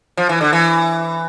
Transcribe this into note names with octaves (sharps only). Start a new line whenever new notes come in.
F3
E3
D3
E3